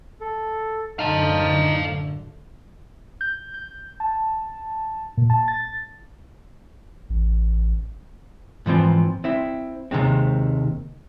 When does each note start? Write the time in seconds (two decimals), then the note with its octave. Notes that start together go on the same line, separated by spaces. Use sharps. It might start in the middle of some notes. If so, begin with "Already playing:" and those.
0.21 A4
0.99 F#2 A2 D3 D#4 F5 A5 F6
3.21 G6
3.54 G6
4.00 A5
5.17 A#2
5.30 A5
5.48 A6
7.10 A1
8.66 G#2 E3 F3 C4
9.24 C4 E4
9.91 D#2 C3 D#3 G#3 C4